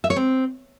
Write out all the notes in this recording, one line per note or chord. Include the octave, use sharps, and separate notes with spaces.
E5
C#5
C4